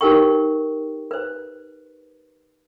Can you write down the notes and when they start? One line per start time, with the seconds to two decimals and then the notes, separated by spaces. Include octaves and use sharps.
0.01 D#4 G4 A#4 B4 G5 C#6
1.11 B4 C5